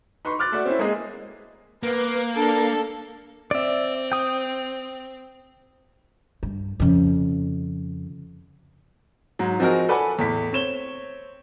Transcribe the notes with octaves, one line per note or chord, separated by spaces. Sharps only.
D#4 B4 C6 C#6
D6 F6 F#6 A6
A3 F#4 D5
C4 C#4 E4
G#3 A#3 C4 G#4 D#5
A#3 B4
D4 A4
C4 D5 E5
G5 D#6
G2
F2 C#3
G#2 F#3
F3 C4 D#4 F#4 G#4 A#4
A4 B4 D5 F#5 G#5 B5
E2 A2 B6
C4 C#5 E7 G7